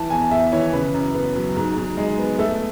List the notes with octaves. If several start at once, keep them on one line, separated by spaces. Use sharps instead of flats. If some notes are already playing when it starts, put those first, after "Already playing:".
Already playing: E3 A5
E2 G#5
E2 E5
E3 C#5
C#3 B4
F#2
B3
F#3
G#2
G#2
G#3
B3
A3 A4